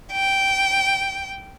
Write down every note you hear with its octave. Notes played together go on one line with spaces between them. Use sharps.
G5